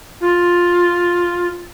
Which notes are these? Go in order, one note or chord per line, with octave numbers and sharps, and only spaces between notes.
F4